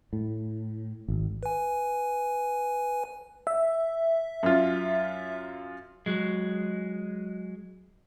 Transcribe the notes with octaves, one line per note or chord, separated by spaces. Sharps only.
A2
G#1
B4 G#5
E5
F#2 F4
F#3 G#3